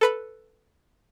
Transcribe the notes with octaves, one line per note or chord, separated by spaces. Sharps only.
A4 B4 B5